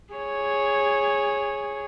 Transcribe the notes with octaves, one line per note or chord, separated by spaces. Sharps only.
G#4 C#5